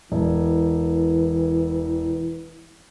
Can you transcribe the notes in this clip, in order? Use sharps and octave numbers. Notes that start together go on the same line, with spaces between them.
E1 E3